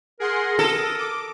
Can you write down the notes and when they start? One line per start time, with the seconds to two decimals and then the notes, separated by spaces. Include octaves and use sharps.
0.20 G#4 A#4 F#5 C6
0.59 A4 D#6
0.98 D6